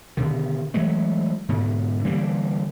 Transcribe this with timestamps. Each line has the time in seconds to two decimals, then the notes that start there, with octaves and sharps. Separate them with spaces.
0.17 B2 D3 D#3
0.74 E3 F#3 G#3 A3
1.49 G#2 B2 D3
2.05 D3 E3 G3 A#3